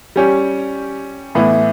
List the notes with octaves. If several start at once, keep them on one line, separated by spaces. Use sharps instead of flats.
G3 C#4 G4
A2 E3 B3 E4